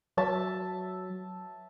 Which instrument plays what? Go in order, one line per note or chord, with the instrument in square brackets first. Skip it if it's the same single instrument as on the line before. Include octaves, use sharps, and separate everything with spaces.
[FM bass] F#3 [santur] E5 A5 E6